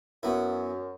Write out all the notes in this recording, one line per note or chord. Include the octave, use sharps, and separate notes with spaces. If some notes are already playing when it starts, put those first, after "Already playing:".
F#2 B3 E4